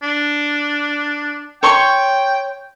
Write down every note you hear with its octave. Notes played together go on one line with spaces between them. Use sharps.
D4
C#5 G5 C6 C#6